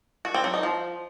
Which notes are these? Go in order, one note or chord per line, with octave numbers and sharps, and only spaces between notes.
F#4
C4
F#3
D#4
F3